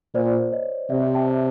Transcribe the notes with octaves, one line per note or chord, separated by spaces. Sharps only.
A#2 C5 D5
C#5 D#5
C3 D5 E5
G5 A5